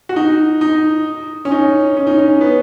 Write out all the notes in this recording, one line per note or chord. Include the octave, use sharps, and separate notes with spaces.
F#4
D#4
D#4
C#4
D#4
C#4
D#4
C#4
B3